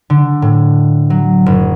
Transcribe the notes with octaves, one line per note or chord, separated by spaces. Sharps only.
D3
A2
F#3
F#1